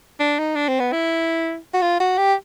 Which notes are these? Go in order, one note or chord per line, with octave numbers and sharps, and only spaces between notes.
D4
D#4
D4
C4
B3
E4
F#4
F4
F#4
G4